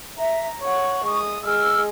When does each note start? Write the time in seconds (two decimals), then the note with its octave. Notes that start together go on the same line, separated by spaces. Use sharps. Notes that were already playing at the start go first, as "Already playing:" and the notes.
0.18 E5 A#5
0.62 C#5 F#5 C#6
1.05 G#3 D#6
1.44 G#3 G#4 E6 F6